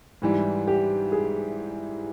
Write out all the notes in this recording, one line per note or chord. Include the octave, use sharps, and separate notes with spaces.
G#2 E3 G3 E4
G4
G#4